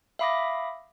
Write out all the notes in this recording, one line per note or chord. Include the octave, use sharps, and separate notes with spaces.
E5 F5 B5 D6 D#6 A#6